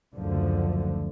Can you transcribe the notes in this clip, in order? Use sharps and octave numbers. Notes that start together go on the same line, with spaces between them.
F#1 D2 D3 F3